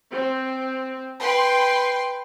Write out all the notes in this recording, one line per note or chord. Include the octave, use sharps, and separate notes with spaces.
C4
B4 G5 C6